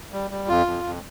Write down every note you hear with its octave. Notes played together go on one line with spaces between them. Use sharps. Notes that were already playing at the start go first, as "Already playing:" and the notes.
G3
G3
F2 F4
F2
F2